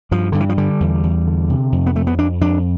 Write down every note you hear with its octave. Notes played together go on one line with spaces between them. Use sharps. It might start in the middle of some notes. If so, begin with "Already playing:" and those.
G2 F3
G2 D3
E3
F3
D3 G3
E2
E2
D3
C3
F2
B3
F2 A3
B3
F2 D4
F2 D4